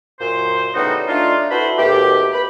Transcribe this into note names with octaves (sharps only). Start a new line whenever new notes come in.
F#2 A#2 C5
A2 C#3 G3 B3 D#4 F#4
A3 D4 D#4 F4
E4 F#4 A4 B4 C5 B5
D#2 B2 A3 G4
B4 B5